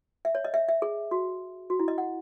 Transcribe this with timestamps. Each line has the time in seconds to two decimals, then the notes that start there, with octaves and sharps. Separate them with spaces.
0.25 E5
0.35 C#5
0.45 D#5
0.54 E5
0.68 E5
0.82 G#4
1.11 F#4
1.70 F#4
1.80 E4
1.88 D#5
1.98 F#5